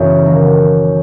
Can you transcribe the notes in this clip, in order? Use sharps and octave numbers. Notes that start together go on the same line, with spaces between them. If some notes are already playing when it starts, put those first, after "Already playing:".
Already playing: F#2 C#3 E3 B3 F#4 G#4
D#3 F#3 A#3